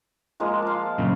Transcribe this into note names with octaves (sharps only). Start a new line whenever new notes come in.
F3 G#3 A#3
F5 A5
F#2 A#2 C#3